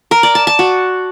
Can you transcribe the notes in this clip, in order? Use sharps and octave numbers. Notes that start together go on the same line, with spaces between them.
A#4
D5
A5
A5
F#4